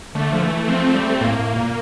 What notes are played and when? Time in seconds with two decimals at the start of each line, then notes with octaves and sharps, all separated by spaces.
0.15 D3 A3
0.33 F3
0.42 E3
0.68 F3 C4
0.95 G3
1.21 A2 A#3
1.39 A2
1.56 A#2